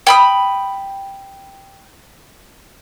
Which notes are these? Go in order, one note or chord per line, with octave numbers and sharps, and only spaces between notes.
G5 B5 D#6